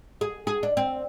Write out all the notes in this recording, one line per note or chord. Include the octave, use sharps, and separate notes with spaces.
G#4
G#4
D4
C4